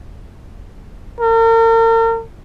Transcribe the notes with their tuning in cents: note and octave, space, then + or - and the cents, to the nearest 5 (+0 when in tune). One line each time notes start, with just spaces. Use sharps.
A#4 -40